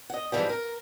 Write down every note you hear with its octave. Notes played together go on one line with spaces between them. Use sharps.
D#5 F#5
G#2 E3 F3 G3
A#4